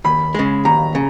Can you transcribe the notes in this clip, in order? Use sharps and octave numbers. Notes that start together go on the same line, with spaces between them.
D#2 B5
C#3 G#3
D#2 A#5
C#3